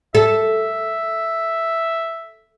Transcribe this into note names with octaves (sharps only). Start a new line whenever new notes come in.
A4 E5